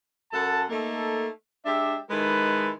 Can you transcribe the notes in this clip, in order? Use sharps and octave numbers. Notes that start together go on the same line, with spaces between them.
F#2 A4 F#5 A5
A3 A#3 D#4 A4
G#3 D4 G4 E5
D#3 G#3 E4 A4 B4